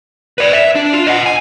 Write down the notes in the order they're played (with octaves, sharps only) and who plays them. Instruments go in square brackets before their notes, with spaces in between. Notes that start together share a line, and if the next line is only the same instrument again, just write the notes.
[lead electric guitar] B4 D5
E5
D4
F4
D#5 F#5
G#5